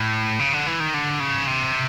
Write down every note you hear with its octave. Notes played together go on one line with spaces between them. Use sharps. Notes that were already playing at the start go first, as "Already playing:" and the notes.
Already playing: A2
C#3
D3
E3
D#3
D3
C#3
C3